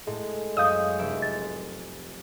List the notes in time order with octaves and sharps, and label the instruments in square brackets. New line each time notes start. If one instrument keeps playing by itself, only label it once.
[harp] A2 [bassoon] G#3
[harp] F#2 [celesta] D#5 F5 G6 [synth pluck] D#6
[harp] F1 E5 D7
[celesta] A6